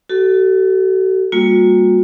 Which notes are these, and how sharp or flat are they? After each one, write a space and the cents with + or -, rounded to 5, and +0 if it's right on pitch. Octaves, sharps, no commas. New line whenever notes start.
F#4 +40 A4 +0
G3 +20 A#3 -5 F#4 -45